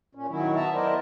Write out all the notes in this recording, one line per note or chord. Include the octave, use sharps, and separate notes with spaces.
A#2 C#4
D#3 F#3 E4
B3 E5 A5 A#5
E4 A#4 C5 D5 D#5